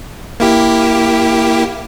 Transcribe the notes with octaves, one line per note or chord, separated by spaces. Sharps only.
A#3 E4 G4